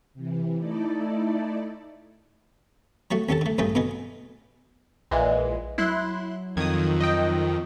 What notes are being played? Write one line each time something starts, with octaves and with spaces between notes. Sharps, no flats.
C3 E3
A3 D#4 E4 A4 D5
F#3 A3 F#4
D#2 C#4 G4 A4 A5
D3 A3
A#1 G2 C#3 A3 G#4 G5
B2 D3 B3 D#5 G#5
A#1 A#2 E3 G#3
F#3 E4 C6 F#6
F2 D#3 D#6 G#6
D#5 G5